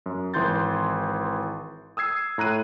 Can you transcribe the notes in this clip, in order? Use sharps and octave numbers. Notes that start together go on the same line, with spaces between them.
F#2
G#1 E3 C6 G6 A6
D#6 E6 G#6 C7
A2 A#5 F#6 D#7